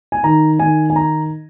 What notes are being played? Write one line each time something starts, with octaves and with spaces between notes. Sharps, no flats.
G#5
D#3 A#5
D#3 G#5
G#5
A#5